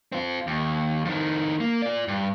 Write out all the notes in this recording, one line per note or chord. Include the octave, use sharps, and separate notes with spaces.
C4 F4
D#2
F2 D#3
A#3
F4 D5
G2